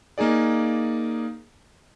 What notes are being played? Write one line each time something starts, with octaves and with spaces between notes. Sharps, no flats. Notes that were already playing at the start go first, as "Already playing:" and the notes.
A#3 D#4 G#4 D5